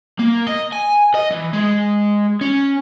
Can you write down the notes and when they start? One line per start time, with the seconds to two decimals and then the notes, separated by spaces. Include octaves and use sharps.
0.19 A#3
0.47 D#5
0.73 G#5
1.15 D#5
1.31 E3
1.53 G#3
2.41 C#4